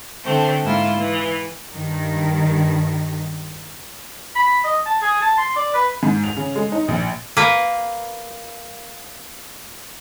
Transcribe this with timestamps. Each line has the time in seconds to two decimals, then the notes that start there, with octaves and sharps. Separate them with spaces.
0.23 D3 A3 C4
0.62 G#2 A#3 E4 F4
0.96 E3
1.71 G2 D#3
4.35 B5
4.64 D#5
4.86 A5
5.02 G#4
5.22 A5
5.38 C6
5.56 D5
5.74 B4
6.03 G#2
6.24 F7
6.37 C#3
6.55 G#3
6.72 D#4
6.88 A#1
7.37 A#3 B4